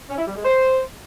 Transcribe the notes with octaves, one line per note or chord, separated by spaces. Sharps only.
C#4
E4
G3
G#3
C5